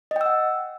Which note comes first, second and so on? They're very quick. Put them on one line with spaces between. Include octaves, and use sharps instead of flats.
D#5 G5 E6 F#5